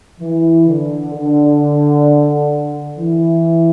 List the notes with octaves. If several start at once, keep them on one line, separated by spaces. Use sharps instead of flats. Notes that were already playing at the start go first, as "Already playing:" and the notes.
E3
D3
D3
E3